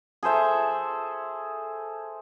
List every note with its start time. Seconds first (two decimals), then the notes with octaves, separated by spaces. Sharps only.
0.23 G#4 A4 C5 E5